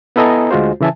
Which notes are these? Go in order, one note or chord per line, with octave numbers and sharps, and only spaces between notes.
B3 E4 A4 D#5 G#5 A#5
D2 G#3 F4 F#4 C5
C#3 E3 E5 G#5 A5